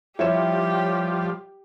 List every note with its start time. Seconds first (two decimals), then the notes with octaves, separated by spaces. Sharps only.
0.19 F3 G3 E4 G4 C#5 E7